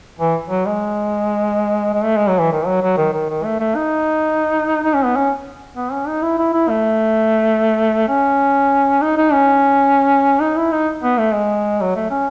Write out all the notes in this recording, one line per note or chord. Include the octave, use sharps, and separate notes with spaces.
E3
F#3
G#3
G#3
A3
G#3
F#3
E3
D#3
F#3
F#3
D#3
D#3
D#3
A3
A3
D#4
D#4
C#4
B3
C#4
B3
C#4
D#4
E4
E4
E4
A3
C#4
D#4
D#4
C#4
D#4
E4
D#4
B3
A3
G#3
F#3
A3
C#4